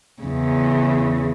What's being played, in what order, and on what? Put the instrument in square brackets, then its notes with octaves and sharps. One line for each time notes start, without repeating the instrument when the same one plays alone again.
[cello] E2 C#3